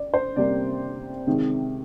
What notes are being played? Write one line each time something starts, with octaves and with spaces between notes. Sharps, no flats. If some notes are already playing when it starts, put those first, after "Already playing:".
Already playing: D5
C5
C3 G3 A#3 D5
C3 D#3 G#3